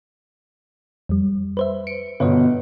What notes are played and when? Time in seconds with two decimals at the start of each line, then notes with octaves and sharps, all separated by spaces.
1.09 F2 G3
1.57 B4 C5 E5
1.87 C#7 D7
2.20 G1 B2 B4 C#5 D#5